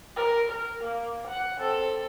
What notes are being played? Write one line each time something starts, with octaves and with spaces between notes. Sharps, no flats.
A#4
A#4
A#3
F#5
C4 A4